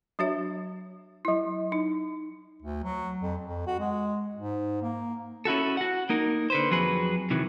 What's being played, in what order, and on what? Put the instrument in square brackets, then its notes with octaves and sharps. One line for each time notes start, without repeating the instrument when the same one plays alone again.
[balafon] F#3 D4 F#4 C#5 E5
F#3 E4
D#4
[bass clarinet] D2
F#3
F2
F2
F#4
G#3
G#2
A#3
[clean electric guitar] C#4 E4 F#4 A4
F#4 F#5
A#3 D#4 A#4
D3 B4 C5
F2 F#3 G#4 B4
C3 D#3 E3 F#3